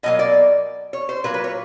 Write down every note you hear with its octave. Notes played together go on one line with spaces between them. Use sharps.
B2 F#3 A#3 D#5
D5
C#5
C5
A#2 F#3 A#3 B4
B4
C#5